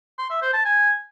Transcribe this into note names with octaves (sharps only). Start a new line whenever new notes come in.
C6
E5
C5
A5
G#5